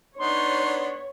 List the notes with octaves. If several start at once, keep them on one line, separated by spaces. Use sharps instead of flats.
B3 D4 D#4 C#5 C6